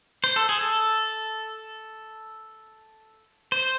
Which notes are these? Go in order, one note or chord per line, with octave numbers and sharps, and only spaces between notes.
C5
A4
G#4
A4
C5